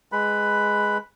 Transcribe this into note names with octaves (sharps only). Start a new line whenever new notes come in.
G#3 B4 B5